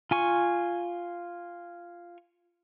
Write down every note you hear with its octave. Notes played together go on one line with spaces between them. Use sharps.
F4 G#5 C#6